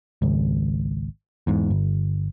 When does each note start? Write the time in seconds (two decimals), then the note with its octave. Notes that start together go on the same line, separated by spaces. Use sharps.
0.22 G#1 C#2
1.47 E2 G#2
1.70 G1